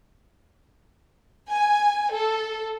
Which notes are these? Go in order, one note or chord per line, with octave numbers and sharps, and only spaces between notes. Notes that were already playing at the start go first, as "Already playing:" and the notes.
G#5
A4